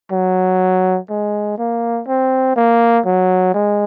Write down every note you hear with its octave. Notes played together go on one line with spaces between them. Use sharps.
F#3
G#3
A#3
C4
A#3
F#3
G#3